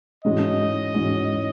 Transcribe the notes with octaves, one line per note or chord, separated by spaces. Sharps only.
G#2 E3 G#3 C#4 F#4 D#5
G#2 E3 G#3 C#4 F#4